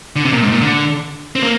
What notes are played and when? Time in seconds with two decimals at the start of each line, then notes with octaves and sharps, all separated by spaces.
0.16 D3
0.25 C3
0.33 A#2
0.42 G#2
0.52 A#2
0.61 D3
1.36 C4
1.43 A#3